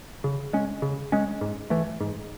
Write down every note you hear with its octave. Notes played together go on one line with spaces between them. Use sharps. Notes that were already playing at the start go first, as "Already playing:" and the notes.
C#3
G#3 C#4
C#3
G#3 C#4
G#2
E3 A3
G#2